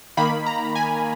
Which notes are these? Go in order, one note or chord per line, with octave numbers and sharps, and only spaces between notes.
D#3 A#3 B5
A#5
G#5